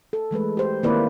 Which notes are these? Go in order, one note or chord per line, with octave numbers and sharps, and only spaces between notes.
A4
E3 G#3 A3 B4
G4 C5
D#3 A#3 C4 E4 B4 D5